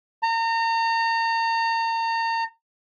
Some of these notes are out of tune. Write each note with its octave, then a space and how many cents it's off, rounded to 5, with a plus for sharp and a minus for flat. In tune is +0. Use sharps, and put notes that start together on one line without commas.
A#5 -35